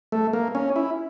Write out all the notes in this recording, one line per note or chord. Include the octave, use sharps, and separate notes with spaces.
A3
A#3
C#4
E4